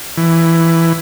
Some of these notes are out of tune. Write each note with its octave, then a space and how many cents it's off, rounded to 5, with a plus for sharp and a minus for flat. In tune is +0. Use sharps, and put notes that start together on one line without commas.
E3 +10